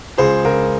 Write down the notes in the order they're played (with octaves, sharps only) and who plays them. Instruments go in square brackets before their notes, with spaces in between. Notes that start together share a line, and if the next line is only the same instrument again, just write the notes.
[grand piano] C#2 G#4 C5
C#2 A#4